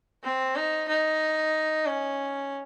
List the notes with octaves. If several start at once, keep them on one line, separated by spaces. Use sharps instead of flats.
C4
D#4
D#4
C#4